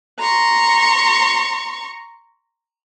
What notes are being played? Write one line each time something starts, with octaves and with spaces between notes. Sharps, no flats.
A#5 C6 C#6